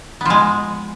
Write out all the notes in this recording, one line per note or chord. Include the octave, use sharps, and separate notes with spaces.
F3 G#3 B3